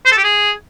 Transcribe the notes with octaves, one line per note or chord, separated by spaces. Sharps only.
C5
A4
G4
G#4